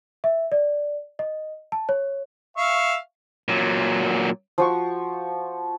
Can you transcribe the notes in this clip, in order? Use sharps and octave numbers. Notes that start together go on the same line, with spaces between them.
E5
D5
D#5
A5
C#5
E5 F5 C#6
A#2 F#3
F3 F#4 C#6